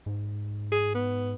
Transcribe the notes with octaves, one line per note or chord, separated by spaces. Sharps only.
G#2
G#4
B3